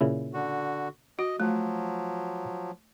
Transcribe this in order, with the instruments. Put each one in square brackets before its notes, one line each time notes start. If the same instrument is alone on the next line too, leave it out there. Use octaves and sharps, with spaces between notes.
[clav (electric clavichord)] A#2 C#3 E4
[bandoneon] D3 F#4
[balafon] F#4 [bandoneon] D#5
[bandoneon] F3 F#3 [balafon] A3